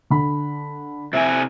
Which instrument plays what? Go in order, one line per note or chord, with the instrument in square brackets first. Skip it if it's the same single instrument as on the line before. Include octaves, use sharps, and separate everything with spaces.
[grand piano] D3 B5
[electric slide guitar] C3 E4 G#5 [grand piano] E5